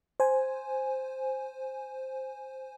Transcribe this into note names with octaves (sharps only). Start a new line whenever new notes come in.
C5 G#5